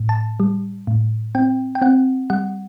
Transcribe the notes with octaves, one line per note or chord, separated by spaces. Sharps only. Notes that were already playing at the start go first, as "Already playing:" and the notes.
Already playing: A2
A5
G3
A2
C4 G5
G5
C4 F#5
G3 F#5